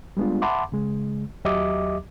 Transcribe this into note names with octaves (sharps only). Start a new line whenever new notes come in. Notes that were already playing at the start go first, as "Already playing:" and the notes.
G3 G#3 B3 D4 F4
E5 F#5 A5 B5 C6 D6
C#3 G#3
D#2 F#3 G4 D#5 E5 D6